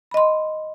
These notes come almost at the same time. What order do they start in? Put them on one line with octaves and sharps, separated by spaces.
B5 D#5 C6